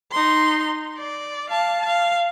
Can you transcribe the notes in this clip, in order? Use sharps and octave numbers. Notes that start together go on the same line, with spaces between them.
D#4 C6
D5
F5 A5
F5